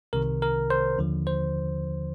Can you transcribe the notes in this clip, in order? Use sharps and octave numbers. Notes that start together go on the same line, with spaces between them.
C2 C3 D#3 A#4
A#4
C5
D#2 D3 F3
C5